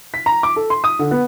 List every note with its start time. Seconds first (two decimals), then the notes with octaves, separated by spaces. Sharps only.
0.14 B6
0.26 A#5
0.43 D6
0.56 A4
0.70 C6
0.84 D#6
0.99 D3
1.11 B3